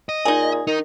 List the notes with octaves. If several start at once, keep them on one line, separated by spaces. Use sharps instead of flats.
D#5
A#2 D#4 G#4
D#3 D#4